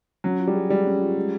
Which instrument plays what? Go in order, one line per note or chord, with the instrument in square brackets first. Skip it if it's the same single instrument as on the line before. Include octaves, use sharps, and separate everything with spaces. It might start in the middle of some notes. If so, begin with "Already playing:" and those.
[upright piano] F#3 [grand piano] C#4
[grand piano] F4
[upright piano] G3
[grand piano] G#4
[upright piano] G3 [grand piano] G#3
[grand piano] C#4
F4
G#3